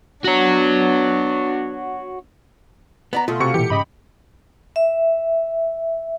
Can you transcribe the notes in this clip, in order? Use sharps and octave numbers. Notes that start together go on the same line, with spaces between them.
B3 D4 F#4 C#5
B3 D5 A#5
B2 A3 F4
C3 F#4 C#6 C#7
A#2 E3 G4 C#7
G#2 C#3 D#5 B5
E5